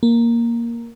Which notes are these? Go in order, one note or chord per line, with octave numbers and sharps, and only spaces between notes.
A#3